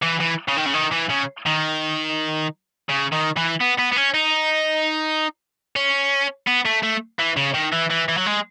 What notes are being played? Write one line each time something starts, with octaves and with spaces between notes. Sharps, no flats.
E3
E3
C#3
D#3
C#3
D#3
E3
C#3
D#3
C#3
D#3
E3
B3
B3
B3
C#4
D#4
C#4
B3
A3
A3
E3
C#3
D#3
E3
E3
E3
F#3
G#3